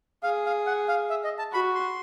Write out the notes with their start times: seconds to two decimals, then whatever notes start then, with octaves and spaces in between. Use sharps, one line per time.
0.23 G#4 F5
0.46 F5
0.67 F#5
0.88 F5
1.10 E5
1.24 D#5
1.39 A5
1.52 F#4 B5
1.75 C6